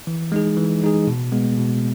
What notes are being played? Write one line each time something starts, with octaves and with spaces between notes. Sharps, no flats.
E3
G#3 D#4 G#4
E3
G#3 D#4 G#4
B2
G#3 B3
B2